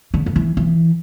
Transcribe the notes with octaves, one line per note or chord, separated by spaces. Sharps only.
D3
D3
E3
E3